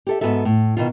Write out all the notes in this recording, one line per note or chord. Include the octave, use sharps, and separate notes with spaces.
G4 A4 E5
G#2 B2 B3 F#4 A4 E5
A2
B2 D#3 F4